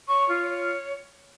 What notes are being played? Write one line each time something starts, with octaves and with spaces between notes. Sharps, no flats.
C#5 C#6
F4
C#5